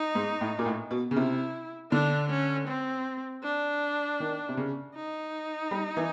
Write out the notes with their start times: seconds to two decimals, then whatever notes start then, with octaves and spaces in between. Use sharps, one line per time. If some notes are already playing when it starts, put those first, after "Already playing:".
Already playing: D#4
0.15 G#2
0.41 A2
0.59 A#2
0.66 A2
0.91 B2
1.11 C#3
1.16 C3 E4
1.91 D3 D4
2.30 C#4
2.68 C4
3.43 D4
4.20 D#3
4.49 C3
4.57 C#3
4.96 D#4
5.71 G3
5.97 E3